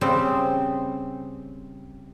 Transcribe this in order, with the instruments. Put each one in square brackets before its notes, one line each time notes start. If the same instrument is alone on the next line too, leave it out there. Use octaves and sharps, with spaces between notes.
[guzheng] C#3 G3 C4